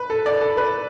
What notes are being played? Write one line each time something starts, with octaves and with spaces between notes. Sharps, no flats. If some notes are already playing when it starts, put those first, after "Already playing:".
Already playing: B4
A4
D5
A4
B4